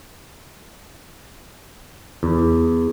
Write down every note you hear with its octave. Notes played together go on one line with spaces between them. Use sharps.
E2